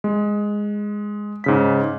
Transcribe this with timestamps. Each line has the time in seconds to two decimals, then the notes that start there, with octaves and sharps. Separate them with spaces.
0.04 G#3
1.44 G#2 C#3 B6